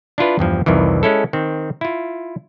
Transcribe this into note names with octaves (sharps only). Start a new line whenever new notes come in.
D4 E4 F4 B4
E2 G2 F3
C2 F2 D#3 E3
G#3 C#4 E4 A4
D#3 C4
E4 F4